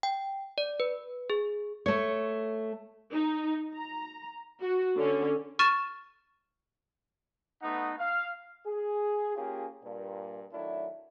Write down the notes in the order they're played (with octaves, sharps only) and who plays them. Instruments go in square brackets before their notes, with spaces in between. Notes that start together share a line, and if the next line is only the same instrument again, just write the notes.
[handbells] G5
D5
B4
G#4
[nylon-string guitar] A3 C#5
[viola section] D#4
A#5
F#4
D3 C#4
[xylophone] C#6 F6 A6 D#7 E7
[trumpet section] A3 B3 D#4 B4 F#5 D#6
F5
[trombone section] G#4
A#3 C#4 F4 G4 G#4
G2 A#2
D#3 F#3 A3 D4 E4